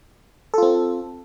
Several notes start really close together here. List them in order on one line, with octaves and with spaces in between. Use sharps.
A4 F4 C4